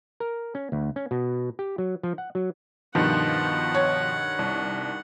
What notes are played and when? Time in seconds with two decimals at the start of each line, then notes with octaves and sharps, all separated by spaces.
0.20 A#4
0.55 C#4
0.72 D2
0.96 C#4
1.11 B2
1.59 G4
1.78 F#3
2.03 F3
2.18 F#5
2.35 F#3
2.95 G2 B2 D#3 F3 F#5
3.74 C#5
4.39 C2